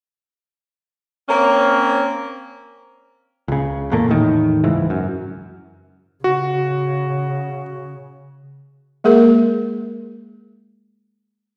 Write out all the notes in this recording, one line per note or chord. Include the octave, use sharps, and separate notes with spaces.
A#3 C4 C#4
C#2 C#3
E2 A#2 A3 A#3
E2 A2 D#3
F#1 C#2 G#2 E3
F#2
C#3 F#4
G#3 A#3 G#4 A#4